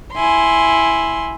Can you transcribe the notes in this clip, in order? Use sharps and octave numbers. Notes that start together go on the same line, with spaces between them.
E4 G#5 C6